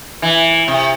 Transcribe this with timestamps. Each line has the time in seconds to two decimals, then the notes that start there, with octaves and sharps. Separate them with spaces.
0.22 E3
0.68 C3